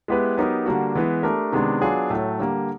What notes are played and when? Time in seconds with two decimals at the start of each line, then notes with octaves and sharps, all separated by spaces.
0.08 G#3 B3 E4 G4 B4
0.37 F#3 B3 D#4 G4 A#4
0.66 D3 G3 A#3 D4 F#4
0.95 E3 G#3 B3
1.23 A3 D4 G4 A#4
1.52 C3 D#3 G#3 B3 D4
1.81 F#3 B3 D4 F4 G#4
2.10 A2 F#3 A3
2.39 D3 G3 A#3